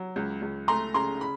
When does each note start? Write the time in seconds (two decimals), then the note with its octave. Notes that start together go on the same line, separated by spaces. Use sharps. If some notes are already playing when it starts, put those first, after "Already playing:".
Already playing: F#3
0.16 C#2
0.42 C#2
0.68 A3 A#5 C6
0.94 C#3 A#5 C6
1.21 B5